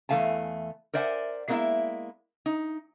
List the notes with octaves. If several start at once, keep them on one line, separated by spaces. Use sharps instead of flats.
E2 E3 A3 F5 G#5 A5
A#4 C5 D5 E5 F#5 G#5
G#3 A#3 B3 D#4 E4 E5
D#4